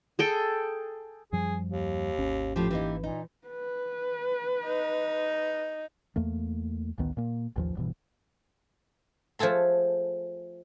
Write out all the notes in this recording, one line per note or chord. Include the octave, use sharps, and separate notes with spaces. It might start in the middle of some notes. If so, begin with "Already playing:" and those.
G#4 A4 G5
F#2 F3 G3 G#4
D#2
G#1 C#4
A2 F3 G4
E3 A#3 D#4
A#2 D#4
B4
D#4
E2 A3 A#3
A1 D2 D#3 B3
A#2 A#3
A1 D#2 F3
D1 G2 B2 E3
F3 A3 G#4 A4 C6